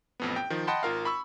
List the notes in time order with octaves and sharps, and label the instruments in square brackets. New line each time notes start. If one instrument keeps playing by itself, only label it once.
[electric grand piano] A1 F2 B3
G5
D#3 F3
D#5 F#5 G5 A5 B5 C6
G#1 F4 A#4 F5
B5 C#6 E6